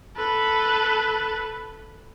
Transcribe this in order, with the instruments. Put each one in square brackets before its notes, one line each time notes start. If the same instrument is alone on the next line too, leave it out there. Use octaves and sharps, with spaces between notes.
[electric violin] A4 B4